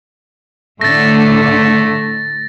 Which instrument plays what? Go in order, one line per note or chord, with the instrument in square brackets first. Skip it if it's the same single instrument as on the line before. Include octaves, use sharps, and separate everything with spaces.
[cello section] A2 D3 [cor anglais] A3 [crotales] A6 A#6